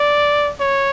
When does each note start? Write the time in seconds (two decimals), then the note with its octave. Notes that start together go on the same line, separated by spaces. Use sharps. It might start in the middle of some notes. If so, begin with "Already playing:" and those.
Already playing: D5
0.60 C#5